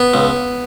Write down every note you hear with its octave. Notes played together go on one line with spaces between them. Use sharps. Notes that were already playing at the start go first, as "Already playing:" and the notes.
Already playing: B3
C#2